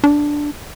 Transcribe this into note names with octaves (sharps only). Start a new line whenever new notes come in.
D4